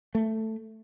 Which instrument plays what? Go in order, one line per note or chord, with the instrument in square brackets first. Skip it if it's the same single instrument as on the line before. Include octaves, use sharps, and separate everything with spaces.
[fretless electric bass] A3